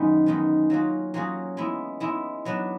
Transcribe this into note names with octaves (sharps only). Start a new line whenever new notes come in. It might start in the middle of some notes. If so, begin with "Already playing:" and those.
Already playing: F#2 D#3 G#3 B3
F#2 D#3 G#3 B3
F#3 A#3 C#4 F4 G#4
F#3 A#3 C#4 F4 G#4
G#3 B3 E4
G#3 B3 E4
F#3 B3 D4